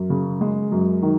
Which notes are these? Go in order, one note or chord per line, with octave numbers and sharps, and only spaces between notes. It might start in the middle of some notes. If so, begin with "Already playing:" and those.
Already playing: F#2
C#3
G#3
F#2
D#3